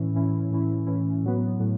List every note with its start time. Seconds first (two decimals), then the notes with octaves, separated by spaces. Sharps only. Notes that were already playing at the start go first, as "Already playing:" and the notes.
Already playing: A2 E3 C#4 E4
0.14 A2 E3 C#4 E4
0.50 A2 E3 C#4 E4
0.87 A2 E3 C#4 E4
1.23 A2 F#3 B3
1.60 A2 F#3